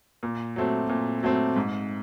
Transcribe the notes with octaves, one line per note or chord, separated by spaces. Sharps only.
A#2
F#3 A3 C4
A#2
F#3 A3 C4
G#2